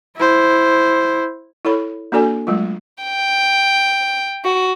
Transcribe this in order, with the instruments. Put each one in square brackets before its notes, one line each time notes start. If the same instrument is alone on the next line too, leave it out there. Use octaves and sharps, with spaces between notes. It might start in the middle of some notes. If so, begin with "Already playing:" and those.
[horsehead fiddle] E4 C5
[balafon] E4 A4 C#5 B5
A#3 D4 F#4 A4 D5 G#5
F#3 G#3 A3 F4
[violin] G5
F#4